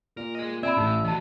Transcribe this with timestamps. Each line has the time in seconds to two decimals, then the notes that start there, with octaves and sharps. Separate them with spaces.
0.17 A#2 A#4
0.35 G#4 D#5
0.63 C4 D5 E5 G#5 B5
0.77 A1 A2 D#4
1.04 E3 F#4 D#5 A5